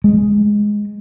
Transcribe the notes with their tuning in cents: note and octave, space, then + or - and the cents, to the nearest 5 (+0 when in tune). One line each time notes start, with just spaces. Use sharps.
G#3 +0